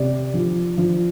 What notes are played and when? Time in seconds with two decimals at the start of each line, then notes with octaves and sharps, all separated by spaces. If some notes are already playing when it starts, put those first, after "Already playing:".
Already playing: C3 D5
0.34 F3
0.78 F3